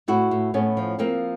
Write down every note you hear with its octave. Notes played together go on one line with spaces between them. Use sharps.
A2 E4 F#4
A2
A2 B3 C#4
F3
F3 A#3 C4